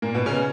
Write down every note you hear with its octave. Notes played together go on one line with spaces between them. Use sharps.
A#2 A#3
B2 B3
C#3 C#4